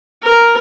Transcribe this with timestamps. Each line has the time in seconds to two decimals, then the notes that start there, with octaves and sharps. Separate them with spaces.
0.23 A#4